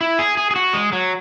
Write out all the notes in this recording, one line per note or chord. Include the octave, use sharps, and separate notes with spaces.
E4
G#4
G#4
G#4
F#4
G#3
F#3